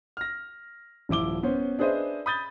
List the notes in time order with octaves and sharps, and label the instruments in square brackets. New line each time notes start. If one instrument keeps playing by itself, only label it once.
[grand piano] F6 A#6
D#1 F3 E4 D6 G7
B3 C#4 C5
D4 G#4 B4 C5 D#5 E5
B5 D#6 G6 A6 G7